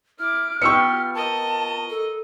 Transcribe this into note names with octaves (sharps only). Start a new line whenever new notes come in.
E4 D6 F6
B3 F4 G4 G5 C#6 E6 C#7
A#4 D#5 A5
A4